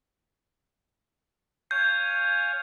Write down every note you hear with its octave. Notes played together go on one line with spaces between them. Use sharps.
C#5 F5 G#5 G6